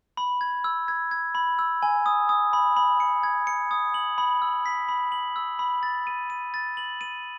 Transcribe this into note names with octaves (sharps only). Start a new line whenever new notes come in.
B5
G#6
E6
G#6
G#6
B5
E6
G#5
D#6
D#6
B5
B5
C#7
G#6
C#7
D#6
F#7
B5
E6
B6
B5
F#7
E6
B5
A6
D#7
D#7
A6
F#7
D#7